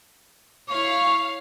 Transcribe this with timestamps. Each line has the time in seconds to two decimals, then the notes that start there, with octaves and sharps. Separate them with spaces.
0.69 E4 C#5 F5 C#6